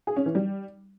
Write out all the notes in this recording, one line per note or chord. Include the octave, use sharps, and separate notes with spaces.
G#4
C#4
E3
G3